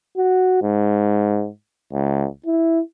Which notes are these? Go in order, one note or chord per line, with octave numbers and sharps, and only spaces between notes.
F#4
G#2
C#2
E4